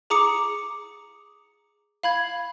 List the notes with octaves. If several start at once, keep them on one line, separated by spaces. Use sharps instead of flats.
G#4 A#5 D6 D#6 C#7
F5 B5 G#6